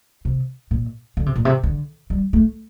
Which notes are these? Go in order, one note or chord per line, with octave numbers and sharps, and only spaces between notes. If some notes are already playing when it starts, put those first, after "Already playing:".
C3
A#2
D3
C3
A#2
C3
D3
G3
A3